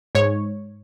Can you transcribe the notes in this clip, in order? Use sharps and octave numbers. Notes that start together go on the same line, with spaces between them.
G#2 C#5